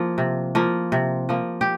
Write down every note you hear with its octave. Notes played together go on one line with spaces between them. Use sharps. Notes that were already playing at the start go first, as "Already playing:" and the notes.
Already playing: F3 A#3
C3
F3 A#3
C3
F3 A#3
G4